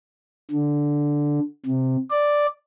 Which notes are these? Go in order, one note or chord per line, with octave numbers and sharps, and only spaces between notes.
D3
C3
D5